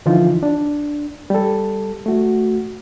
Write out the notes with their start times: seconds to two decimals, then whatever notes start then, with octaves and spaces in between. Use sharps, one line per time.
0.06 D3 E3 F3 D#4 F4
0.43 D4
1.30 G3 A4
2.06 A3 F#4